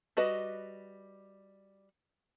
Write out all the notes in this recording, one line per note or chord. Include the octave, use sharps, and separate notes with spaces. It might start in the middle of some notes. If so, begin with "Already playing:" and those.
G3 F#4 B4 D#5